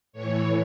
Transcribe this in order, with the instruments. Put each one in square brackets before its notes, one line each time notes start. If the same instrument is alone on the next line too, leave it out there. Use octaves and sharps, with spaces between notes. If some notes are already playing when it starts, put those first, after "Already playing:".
[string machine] A2 E3 C#5